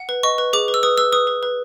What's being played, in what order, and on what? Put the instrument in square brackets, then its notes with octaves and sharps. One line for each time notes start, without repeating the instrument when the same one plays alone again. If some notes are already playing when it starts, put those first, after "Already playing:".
Already playing: [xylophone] F#5
B4
D#5 C#6
B4
G#4 D6
B4
E6
B4 D#6
B4 E6
B4 D#6
B4
B4